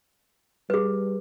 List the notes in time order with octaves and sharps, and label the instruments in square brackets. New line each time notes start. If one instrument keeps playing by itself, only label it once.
[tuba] G3 [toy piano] G#4 B4